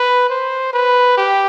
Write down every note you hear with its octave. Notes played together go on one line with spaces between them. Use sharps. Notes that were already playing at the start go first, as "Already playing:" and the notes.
Already playing: B4
C5
B4
G4